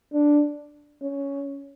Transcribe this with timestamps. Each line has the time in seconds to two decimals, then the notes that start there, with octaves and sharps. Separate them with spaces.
0.13 D4
1.02 C#4